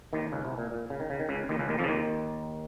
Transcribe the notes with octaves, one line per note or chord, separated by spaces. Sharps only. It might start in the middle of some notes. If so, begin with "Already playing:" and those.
D#2 D#3
C#2 C#3
C2 C3
A#2
A#2
C#3
D#3
C#3
D#3
C#2 C#3
D#2 D#3
C#2 C#3
D#2 D#3
F2 F3
C#3
D#2 D#3